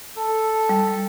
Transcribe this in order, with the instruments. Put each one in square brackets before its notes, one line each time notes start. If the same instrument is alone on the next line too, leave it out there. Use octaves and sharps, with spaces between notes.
[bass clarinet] A4
[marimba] G3